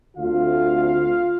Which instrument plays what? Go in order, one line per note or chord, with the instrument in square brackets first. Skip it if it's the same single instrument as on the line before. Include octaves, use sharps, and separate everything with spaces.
[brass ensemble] D2 D3 A3 C4 F4 F5